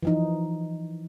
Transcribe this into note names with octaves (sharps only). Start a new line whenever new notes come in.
E3 F3 D#4